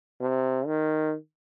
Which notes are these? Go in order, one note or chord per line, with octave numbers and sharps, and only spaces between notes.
C3
D#3